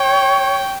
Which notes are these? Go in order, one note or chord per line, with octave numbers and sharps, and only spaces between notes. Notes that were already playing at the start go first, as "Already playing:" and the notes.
Already playing: C#5 G5